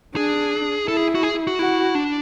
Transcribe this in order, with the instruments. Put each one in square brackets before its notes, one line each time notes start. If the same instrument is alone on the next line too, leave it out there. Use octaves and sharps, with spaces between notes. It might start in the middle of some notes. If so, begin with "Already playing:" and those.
[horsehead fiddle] D4 [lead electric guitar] G#4
[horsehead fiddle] E4 [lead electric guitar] A4
[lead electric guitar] G#4
F#4
G#4
F#4
[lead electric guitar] E4 [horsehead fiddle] F#4
[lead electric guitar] D4